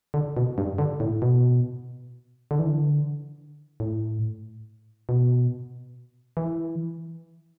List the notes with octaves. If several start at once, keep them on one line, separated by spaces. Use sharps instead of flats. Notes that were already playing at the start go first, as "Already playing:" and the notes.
D3
B2
G2
D3
A2
B2
D3
E3
D3
A2
B2
E3